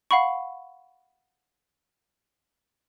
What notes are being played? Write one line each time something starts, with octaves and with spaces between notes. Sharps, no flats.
F5 F#5 B5 C#6